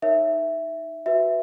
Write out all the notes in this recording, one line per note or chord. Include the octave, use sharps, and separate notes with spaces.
D#4 A#4 C#5 E5
F#4 B4 E5